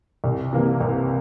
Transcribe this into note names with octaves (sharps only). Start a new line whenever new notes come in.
C2
C3 E3 A#3
C2